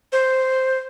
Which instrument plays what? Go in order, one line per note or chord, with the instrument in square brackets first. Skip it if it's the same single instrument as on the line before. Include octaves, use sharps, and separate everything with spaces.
[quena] C5